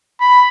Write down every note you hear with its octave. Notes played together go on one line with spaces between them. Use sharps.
B5